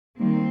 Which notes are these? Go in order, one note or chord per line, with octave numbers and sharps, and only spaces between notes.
D#3 G3 A#3 C4